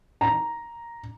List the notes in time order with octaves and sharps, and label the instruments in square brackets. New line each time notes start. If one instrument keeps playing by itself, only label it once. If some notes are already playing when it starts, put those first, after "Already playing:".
[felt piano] A#5